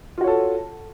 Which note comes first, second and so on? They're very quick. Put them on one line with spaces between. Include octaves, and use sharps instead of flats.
F4 F#4 C#5 A4